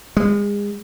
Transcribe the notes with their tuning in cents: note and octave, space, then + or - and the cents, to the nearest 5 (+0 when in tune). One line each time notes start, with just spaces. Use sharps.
G#3 -30